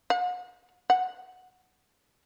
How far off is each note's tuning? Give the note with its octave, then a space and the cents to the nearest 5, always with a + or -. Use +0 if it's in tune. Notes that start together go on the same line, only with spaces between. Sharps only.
F#5 -40
F#5 -5